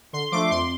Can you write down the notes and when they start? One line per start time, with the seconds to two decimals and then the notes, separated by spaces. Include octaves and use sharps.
0.13 D3 C6
0.32 F3 A3 D4 D6
0.51 F2 C6